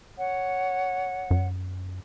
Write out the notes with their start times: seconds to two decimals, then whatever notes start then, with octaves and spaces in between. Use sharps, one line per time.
0.18 C#5 F#5
1.31 F#2